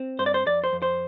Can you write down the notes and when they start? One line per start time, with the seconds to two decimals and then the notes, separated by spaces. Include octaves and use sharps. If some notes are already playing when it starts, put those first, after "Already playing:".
Already playing: C4
0.19 G2 C5
0.26 D5
0.34 C5
0.46 F2 D5
0.64 C5
0.73 F2
0.82 C5